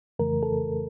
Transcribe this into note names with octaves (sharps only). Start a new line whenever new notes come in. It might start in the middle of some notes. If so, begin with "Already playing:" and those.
F2 C#3 E3 A3 A#4
A4